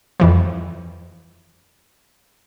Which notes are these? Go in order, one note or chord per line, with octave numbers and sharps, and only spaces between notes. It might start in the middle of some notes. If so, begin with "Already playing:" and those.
F2 E3 F3